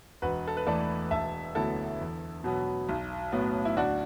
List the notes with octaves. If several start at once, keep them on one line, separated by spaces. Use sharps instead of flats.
E1 F#4 B4
A4
B4
E2 E3 A3 A4 D5
E1 E5 A5
D2 D3 F#3 B3 E4 A4
E2
B2 F#3 B3
B1
A2 F#3 B3
E4
D2 D4 F#4